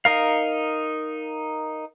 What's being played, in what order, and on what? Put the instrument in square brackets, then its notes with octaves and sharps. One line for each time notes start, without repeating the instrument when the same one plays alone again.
[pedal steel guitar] D#4 A#4 F5